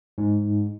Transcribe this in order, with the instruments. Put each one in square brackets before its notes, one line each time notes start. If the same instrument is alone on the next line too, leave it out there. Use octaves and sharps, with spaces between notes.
[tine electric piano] G#2